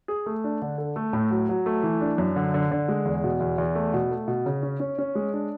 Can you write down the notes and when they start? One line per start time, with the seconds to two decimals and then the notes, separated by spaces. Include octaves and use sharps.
0.08 G#4
0.26 A3
0.44 D4
0.62 D3
0.78 A4
0.96 A3
1.13 A2
1.31 F#3
1.49 F#3
1.66 A3
1.83 E3
2.01 D4
2.18 F#2
2.36 D3
2.54 D3
2.71 D3
2.88 G#3
3.05 E2
3.24 B2
3.40 E2
3.58 E2
3.75 A3
3.94 B2
4.11 A3
4.28 B2
4.46 C#3
4.63 C#4
4.80 C#4
4.98 C#4
5.15 G#3
5.33 D4